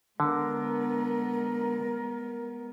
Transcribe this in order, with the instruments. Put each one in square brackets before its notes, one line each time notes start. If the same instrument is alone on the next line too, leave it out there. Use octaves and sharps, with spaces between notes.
[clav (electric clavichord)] D3 [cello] G#3 B3 [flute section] A#4